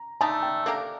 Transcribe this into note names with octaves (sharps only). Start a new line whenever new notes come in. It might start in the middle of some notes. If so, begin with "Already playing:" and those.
Already playing: A#5
D3 A3 D#4 A5
G5
A#3 D4 G4 A4 A#4